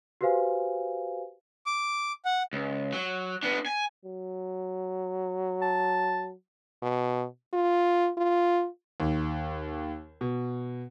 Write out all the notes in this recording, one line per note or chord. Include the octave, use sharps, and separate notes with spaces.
F#4 G4 B4 C5 F5 G#5
D6
F#5
C#2
F#3
B3 D4
G#5
F#3
A5
B2
F4
F4
D#2
B2